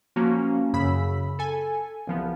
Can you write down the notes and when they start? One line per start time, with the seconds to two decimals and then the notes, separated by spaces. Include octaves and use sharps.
0.16 F3 A#3 C#4 F#4
0.73 F#2 C#3 B5 E6 B6
1.39 A4 G#5
2.07 C2 F3 B3